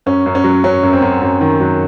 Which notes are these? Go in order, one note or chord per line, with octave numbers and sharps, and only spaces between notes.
F#2 C#4
F#2
C#4
F#3
F#3 C#4
F#2
C4
F#2
F#2
D#3
F#3